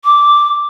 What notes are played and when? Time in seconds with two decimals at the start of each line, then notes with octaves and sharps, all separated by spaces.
0.05 D6